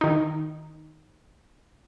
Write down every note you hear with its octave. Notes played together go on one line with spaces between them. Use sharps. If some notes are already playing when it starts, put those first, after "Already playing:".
D#3 D#4